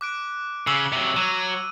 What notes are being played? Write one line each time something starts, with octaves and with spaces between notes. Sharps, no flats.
D6 F#6 D7
C#3 C#6 E6 F#7
C3 F#3
F#3 D#7